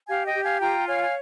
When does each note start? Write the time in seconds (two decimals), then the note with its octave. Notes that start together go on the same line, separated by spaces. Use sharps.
0.08 G4 F5 G#5
0.26 D#5 G5
0.34 G4
0.43 F5 G#5
0.61 F4 G5 A#5
0.86 C#5 F5 G#5
1.02 G#5